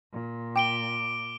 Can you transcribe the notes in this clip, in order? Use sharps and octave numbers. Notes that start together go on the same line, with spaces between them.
A#2
G5 D6 D7 G7